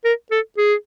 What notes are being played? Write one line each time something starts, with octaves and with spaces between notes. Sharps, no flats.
A#4
A4
G#4